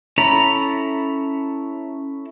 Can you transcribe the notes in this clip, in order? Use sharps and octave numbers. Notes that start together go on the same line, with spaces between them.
C#4 E4 A4 A#5 B5